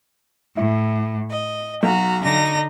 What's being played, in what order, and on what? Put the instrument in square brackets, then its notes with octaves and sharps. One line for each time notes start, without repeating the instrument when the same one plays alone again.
[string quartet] A2 [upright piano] E4
[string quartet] D#5
[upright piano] B1 [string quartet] F#4 A#5
[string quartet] D3 D#4 A#6